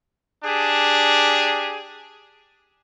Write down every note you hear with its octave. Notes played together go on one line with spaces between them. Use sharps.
D4 G4 G#4